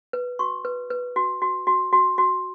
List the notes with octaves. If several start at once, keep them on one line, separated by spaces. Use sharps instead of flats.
B4
F#4 C#6
B4
B4
F#4
F#4
F#4
F#4
F#4